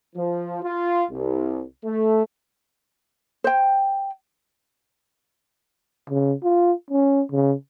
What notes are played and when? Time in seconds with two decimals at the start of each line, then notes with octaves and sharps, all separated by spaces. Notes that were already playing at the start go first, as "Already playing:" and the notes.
0.16 F3
0.63 F4
1.10 C2
1.85 A3
3.44 C5 G5
6.10 C#3
6.44 F4
6.90 C#4
7.32 C#3